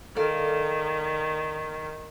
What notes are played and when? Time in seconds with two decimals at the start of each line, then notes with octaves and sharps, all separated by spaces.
0.16 D#3 A4 D5 F5